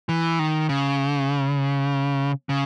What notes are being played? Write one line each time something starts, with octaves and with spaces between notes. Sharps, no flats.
E3
D#3
C#3
C#3